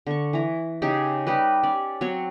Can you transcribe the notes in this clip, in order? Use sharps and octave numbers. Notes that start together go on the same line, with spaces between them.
D3 C#6
E3 A#5
C#3 D#4 G4 G#4
G3 D#4 G4 B4
C#4 D5
F#3 C4 C#5